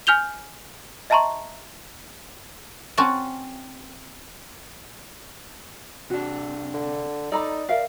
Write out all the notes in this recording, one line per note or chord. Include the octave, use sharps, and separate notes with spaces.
G#5 F6 G6 F7 G7
D#5 E5 A5 A#5 C6 C#6
C4 C#4 F#4 G#5 A5
C3 D4 F#4
D3
D#4 A4 D5 A#5 B5
A#4 E5 F5